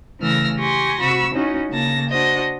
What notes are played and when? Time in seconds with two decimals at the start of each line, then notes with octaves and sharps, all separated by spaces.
0.20 C#3 E3 A3 E6 F6 A#6
0.59 G4 G#5 C6 C#6 A#6
1.00 C3 F#4 B5 C#6 E6
1.34 C#4 D#4 E4 F#4
1.69 C#3 A#3 A5 A#6
2.09 D4 F#4 C5 D#5